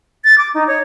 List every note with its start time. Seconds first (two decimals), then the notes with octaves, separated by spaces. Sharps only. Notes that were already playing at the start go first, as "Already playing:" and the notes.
0.24 A6
0.38 D6
0.54 D#4
0.67 C#5